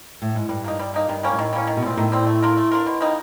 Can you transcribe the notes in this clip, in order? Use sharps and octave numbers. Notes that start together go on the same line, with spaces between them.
A2
G#2
G2 G3
A#3 D#4
G3
A#3 D#4
G2 D#3
G3 A#3 C#4
G#2
A2 D#3
G3 A#3 C#4
D#3
B2
A#2 G3 C4
A2 D#3
G3 C4
A3
D4 F4 A#4
A3
D4 F4 A#4
B2
G3 A#3 D#4